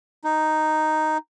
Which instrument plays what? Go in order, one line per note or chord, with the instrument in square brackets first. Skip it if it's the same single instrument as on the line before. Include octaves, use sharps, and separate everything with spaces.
[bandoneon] D#4